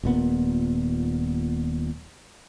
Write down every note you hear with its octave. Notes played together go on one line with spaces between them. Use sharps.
D#1 A#2 B3